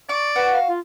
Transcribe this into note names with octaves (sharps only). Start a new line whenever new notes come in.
D5 C#6
F#4 B4
F5
F4